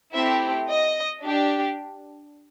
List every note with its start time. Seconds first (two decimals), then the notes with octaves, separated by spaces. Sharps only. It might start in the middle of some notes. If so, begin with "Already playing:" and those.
0.13 A3 C4 E4 G4 E5
0.68 D#5
1.23 D4 G4